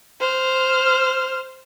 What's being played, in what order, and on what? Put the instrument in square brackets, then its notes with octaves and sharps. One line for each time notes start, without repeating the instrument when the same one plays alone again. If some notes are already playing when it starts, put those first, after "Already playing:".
[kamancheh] C5 F6